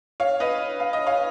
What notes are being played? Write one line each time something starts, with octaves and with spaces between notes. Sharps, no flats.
C#5 F5
B4 D#5
F5
D#5
C#5 F5